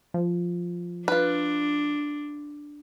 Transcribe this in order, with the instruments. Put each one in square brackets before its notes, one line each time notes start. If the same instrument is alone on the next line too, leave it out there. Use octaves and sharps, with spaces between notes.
[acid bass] F3
[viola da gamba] D4 [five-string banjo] F4 B4